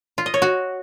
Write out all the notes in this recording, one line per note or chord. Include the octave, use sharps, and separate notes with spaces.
F4
D#5
C#5
F#4